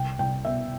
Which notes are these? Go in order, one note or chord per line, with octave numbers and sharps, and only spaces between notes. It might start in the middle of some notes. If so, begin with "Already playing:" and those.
Already playing: C2 G5
C2 G5
B2 E5